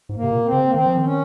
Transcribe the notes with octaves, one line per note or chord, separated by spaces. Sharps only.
G#2
A#3
C3
A#2
C4
C#3
A#3
D#3 C4
F3
D#3 C4
C#4